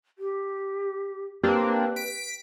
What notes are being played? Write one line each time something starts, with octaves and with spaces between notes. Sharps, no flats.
G4
A#3 C4 D4 G4 B4
B6 D7